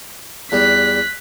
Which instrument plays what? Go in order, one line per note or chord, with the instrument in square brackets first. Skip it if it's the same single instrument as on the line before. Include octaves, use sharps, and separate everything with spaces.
[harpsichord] E2 G3 [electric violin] F#6 B6